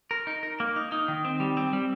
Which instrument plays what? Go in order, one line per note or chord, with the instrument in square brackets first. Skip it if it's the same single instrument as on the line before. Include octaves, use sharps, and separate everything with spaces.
[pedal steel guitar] A#4
D#4
A#4
A#3
D#4
D#4
D#3
C4
G3
C4
G3